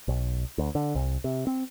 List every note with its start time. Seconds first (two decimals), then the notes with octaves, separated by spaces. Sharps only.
0.08 B1
0.58 D2
0.75 D3
0.95 C2
1.24 C3
1.47 C4